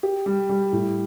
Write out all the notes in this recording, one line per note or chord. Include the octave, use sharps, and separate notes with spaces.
G4
G3
G3
A2